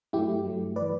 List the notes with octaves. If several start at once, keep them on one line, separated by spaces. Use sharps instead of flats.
G2 F#3 A3 E4 G4
G2 F#3 A3
E3 B4 D5